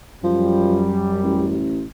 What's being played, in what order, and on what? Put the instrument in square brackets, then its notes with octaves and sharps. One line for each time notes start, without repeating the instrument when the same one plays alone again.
[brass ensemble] F#2 G3 [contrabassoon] F3
[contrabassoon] A1